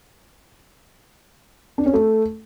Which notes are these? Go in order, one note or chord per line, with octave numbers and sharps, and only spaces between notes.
D4
C#4
A3